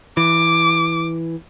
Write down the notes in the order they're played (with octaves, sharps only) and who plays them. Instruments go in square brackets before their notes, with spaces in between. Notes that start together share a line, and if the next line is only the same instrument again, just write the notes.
[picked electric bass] E3 [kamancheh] D6